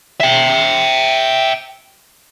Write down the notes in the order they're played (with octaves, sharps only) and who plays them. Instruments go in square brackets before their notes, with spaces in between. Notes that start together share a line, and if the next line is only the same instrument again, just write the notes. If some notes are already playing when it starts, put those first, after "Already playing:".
[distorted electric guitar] E5 G5